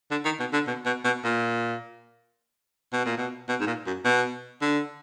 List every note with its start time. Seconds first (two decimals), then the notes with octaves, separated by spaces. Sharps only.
0.11 D3
0.25 D#3
0.40 B2
0.53 D3
0.67 B2
0.85 B2
1.04 B2
1.24 A#2
2.93 B2
3.05 A#2
3.17 B2
3.48 B2
3.60 G#2
3.67 A#2
3.86 F#2
4.05 B2
4.61 D3